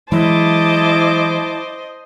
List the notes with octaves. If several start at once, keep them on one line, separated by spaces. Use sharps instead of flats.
E3 F#3 G#3 E4 C5 D#5 A5 D6